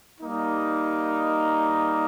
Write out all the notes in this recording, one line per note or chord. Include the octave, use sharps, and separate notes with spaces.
G3 A#3 D#4